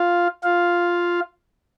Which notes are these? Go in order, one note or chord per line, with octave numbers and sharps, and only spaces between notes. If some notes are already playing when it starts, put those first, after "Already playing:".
Already playing: F4 F5
F4 F5